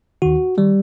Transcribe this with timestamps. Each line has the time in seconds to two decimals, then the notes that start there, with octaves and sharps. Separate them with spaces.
0.22 D#2 D#3 F#4
0.57 D#3 G3